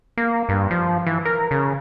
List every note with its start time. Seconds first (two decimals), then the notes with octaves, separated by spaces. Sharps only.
0.17 A#3
0.49 G2
0.71 F3
1.06 E3
1.25 A#4
1.51 C#3